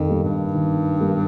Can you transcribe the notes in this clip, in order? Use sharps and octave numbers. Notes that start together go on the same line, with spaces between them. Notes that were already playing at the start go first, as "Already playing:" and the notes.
Already playing: F2 D#3
G3 A#3 D#4
G2
D#3
G3 A#3 D#4